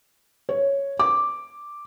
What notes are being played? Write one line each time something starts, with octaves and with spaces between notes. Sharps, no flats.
C#5
D6